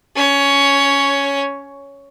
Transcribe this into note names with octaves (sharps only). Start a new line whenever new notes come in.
C#4 C#5